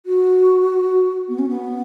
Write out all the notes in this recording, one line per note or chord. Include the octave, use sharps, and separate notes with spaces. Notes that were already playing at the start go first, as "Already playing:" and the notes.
F#4
B3
C#4
B3